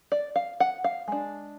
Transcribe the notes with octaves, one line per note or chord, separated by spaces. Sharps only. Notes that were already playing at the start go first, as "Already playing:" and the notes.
D5
F5
F#5
F5
G#3 D4